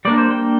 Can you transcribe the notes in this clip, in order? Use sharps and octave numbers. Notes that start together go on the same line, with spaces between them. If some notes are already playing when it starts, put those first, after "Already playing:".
G3 A#3 D4 D5
C5
G5